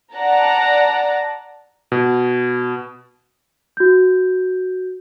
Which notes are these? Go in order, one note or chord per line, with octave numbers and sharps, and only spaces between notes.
D5 F#5 A5 A#5
B2
F#4 G6